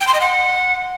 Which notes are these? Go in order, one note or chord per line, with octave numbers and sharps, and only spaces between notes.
G5
C6
D#5
F#5